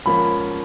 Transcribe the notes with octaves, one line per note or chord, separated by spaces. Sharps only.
G#2 F3 A#3 C#4 B5